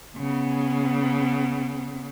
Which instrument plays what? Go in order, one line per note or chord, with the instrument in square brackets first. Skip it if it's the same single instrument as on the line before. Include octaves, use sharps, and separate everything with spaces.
[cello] C#3 B3